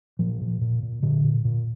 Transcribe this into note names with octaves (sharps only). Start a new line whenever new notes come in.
A#2 F3
A#2
A#2
A#2
A#2 D3
A#2
A#2